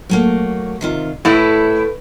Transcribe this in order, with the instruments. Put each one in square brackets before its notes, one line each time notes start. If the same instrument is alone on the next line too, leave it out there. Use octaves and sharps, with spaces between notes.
[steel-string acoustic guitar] F#3 A3 A#3
C3 D#3 F4
[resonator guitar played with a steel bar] A2 E4 [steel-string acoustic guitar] A4 B4